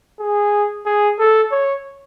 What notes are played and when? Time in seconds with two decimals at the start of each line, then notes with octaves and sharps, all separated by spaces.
0.20 G#4
0.86 G#4
1.19 A4
1.52 C#5